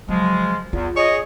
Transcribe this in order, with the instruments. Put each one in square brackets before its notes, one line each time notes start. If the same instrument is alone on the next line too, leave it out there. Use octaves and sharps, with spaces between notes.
[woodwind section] C#3 F3 G#3 [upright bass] F#3
[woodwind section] E2 [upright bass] F4
[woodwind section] G#4 [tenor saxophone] C#5 [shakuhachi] D#5